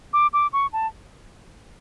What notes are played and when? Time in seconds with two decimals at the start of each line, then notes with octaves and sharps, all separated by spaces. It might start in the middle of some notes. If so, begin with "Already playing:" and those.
0.13 D6
0.33 D6
0.53 C#6
0.73 A5